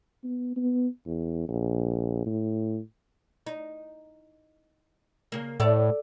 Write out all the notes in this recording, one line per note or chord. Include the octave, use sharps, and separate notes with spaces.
B3
B3
E2
A#1
A2
D#4
C#3 A#3
A2 A4 D5